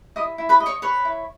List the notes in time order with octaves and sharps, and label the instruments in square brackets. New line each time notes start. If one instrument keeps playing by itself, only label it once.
[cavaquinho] E4 D#5 D#6
E4
B4 B5
D#5
C#5 C#6
B4 C#5 C#6
E4